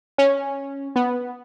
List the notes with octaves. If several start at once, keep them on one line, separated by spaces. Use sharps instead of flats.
C#4
B3